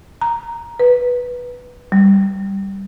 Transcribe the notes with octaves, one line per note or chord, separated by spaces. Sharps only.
A#5
B4
G3